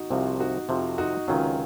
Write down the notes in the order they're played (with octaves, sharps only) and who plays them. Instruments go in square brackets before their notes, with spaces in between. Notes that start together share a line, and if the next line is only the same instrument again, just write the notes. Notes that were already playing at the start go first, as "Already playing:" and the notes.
Already playing: [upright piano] D#4 F#4
[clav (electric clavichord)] C2 C3 F3
[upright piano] D#4 F#4
[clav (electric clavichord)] F2 C3 F3
[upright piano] D#4 F#4
[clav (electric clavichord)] C#2 C3 D#3 F#3 [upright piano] C#4 F4